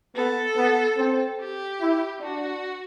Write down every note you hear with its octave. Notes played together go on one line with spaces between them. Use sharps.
B3 A4
B3
C4
G4
E4
D4 F#4